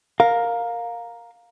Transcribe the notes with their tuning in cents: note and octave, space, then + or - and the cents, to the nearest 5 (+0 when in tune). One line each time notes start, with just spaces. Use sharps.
A#4 +0 F5 +15